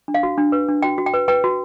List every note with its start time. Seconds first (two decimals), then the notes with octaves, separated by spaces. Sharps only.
0.08 D4
0.14 F5
0.23 F#4
0.38 D4
0.52 B4
0.69 D4
0.83 F#4 G5
0.98 F#4
1.06 G5
1.14 B4
1.28 B4 G5
1.44 F#4